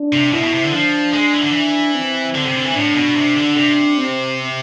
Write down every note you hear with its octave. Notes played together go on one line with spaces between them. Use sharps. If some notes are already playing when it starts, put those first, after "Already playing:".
Already playing: D4
C3
B2 E4
B2
C3
D3
F3 D4
G#3
E3
D3
E3
C4
D3
C3
D3
E3
A2 D4
B2
C3
D3
C3
C4